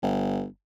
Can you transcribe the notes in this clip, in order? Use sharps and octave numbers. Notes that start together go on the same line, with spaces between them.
G1